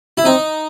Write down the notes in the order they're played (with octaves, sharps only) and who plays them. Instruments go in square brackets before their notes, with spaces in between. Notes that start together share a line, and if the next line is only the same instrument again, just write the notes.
[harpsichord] E4
[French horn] C4 [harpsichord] D#4